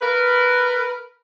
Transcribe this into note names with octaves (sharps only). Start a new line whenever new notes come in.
A#4 B4